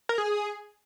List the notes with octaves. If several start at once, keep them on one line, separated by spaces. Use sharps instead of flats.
A#4
G#4